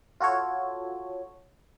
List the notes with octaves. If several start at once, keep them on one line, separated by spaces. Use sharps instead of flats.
F4 F#4 A4 C#5